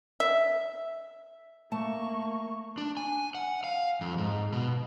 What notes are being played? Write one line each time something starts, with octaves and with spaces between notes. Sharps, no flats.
E5
A3 A#3 A5 C#6
D4
G#5
F#5
F5
F2
G#2
B2